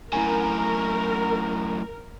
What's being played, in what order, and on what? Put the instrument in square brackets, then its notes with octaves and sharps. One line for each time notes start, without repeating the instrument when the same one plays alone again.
[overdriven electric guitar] F#2 A2 [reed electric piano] E4 G#5 [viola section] A#4 [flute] A#5